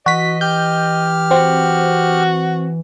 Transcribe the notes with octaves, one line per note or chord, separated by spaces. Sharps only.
E3 F#4 D#5 B6
G4 F6 G6
C4 F#4